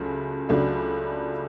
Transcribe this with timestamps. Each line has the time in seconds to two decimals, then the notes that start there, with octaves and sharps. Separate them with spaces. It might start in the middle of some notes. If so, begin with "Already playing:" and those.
Already playing: C#2 C#3 F#3 A3
0.49 C#2 C#3 F#3 A3 D4